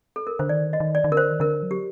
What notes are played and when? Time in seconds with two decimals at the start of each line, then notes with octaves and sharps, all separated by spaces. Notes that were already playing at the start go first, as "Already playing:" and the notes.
0.16 A4
0.27 A#4
0.39 D3 C5
0.49 D#3 D5
0.73 D#5
0.80 D#3
0.95 D5
1.04 D#3
1.10 D3 A#4
1.17 C5
1.31 D#3
1.40 D3 A#4
1.63 F#3
1.71 G4